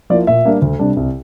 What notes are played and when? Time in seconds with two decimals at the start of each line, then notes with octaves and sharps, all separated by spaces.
0.10 F3 A#3 E4 D5
0.27 A#2 E5
0.45 G3 A#3 D4
0.62 D2
0.79 C3 G3 D4
0.97 C2